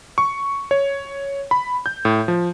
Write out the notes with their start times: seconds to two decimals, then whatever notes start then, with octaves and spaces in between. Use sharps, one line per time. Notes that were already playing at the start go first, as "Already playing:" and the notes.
0.18 C#6
0.71 C#5
1.51 B5
1.86 G6
2.05 A2
2.28 F3